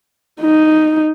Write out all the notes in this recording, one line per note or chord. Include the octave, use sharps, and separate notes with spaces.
D#4